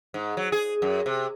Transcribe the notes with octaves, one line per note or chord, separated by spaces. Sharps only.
G#2
F#3
G#4
F#2
C3